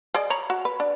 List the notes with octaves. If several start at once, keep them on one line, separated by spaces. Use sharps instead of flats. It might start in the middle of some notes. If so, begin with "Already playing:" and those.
G#4 D5 D#5
C#5 A#5 B5
F#4
B4
D4